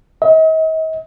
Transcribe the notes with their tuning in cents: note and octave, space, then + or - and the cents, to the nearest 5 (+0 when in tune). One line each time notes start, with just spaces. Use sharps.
D#5 +40